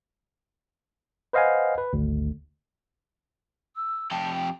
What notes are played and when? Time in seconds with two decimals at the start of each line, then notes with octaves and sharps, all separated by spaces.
1.33 B4 C5 D#5 F5 F#5 G#5
1.78 B4
1.93 G#1 D2
3.76 E6
4.11 F2 G4 A5
4.34 G5